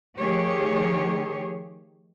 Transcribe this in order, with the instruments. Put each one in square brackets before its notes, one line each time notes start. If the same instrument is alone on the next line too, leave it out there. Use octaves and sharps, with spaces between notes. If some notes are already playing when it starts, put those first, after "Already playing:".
[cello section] D#3 F3 A3 G4 G#4 C#5